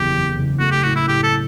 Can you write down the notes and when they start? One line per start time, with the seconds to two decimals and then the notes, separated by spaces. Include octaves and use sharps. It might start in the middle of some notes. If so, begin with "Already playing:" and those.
Already playing: F#1 E2 E4 G4
0.11 E2
0.35 F#1
0.59 A3 F#4
0.71 G4
0.83 A2 F#4
0.95 E4
1.07 A2 G4
1.23 A4